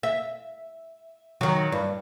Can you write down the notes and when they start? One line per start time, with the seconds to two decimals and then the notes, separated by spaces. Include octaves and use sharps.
0.03 E5
1.41 D#3 F#3
1.72 G2